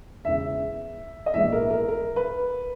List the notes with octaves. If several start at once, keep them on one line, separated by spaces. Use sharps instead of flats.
E1 E2 C#3 E5
D#5
A#1 G#2 E3 G#3 B3 E5
A#4
A#4
A#4
B4